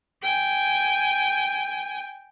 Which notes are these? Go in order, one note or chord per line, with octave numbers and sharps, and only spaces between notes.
G5 G#5